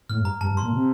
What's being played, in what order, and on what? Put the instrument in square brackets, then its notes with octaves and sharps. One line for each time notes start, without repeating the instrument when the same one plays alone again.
[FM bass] A2 [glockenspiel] F6
[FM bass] G2
[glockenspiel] A#5
[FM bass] G2 [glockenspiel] A5
[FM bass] G2
[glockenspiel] C6
[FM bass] A#2
C3